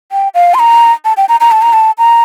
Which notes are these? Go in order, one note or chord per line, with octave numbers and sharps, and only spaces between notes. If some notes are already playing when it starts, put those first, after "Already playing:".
G5
F5
C6
A#5
A5
G5
A#5
A#5
A5
A#5
A5
A#5